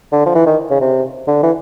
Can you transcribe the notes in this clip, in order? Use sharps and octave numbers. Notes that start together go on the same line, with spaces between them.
D3
F3
E3
D#3
C#3
C3
D3
E3